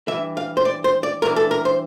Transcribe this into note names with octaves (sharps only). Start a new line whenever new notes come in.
G2 E3 E5
F5
C5
D5
C5
D5
G2 E3 A#4
A4
A#4
C5